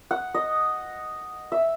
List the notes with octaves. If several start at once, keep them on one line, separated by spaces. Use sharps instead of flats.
F#5
D#5
E5